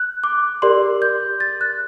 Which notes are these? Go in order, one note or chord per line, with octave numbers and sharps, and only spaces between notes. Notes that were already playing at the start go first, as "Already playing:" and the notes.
Already playing: F#6
D6
G4 A#4 D5 C6
G6
A6
F#6